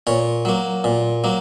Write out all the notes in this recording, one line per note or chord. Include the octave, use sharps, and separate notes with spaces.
A#2 C#5
F#3 A#3
A#2
F#3 A#3